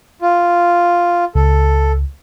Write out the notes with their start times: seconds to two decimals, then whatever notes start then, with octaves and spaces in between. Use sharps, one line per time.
0.22 F4
1.35 C#2 A4